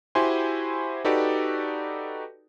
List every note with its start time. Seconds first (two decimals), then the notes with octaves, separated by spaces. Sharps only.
0.15 E4 F#4 G4 C5 G#5 C6
1.05 D#4 F#4 G4 A4 B4 D5